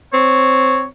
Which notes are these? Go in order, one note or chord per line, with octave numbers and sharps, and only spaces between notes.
C4 C#5